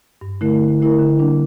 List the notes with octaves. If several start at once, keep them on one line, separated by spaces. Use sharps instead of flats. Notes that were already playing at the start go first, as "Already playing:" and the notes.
G2
D3 A3 E4 A#4
G2
D3 A3 E4 A#4
D3
G3 A#3 D4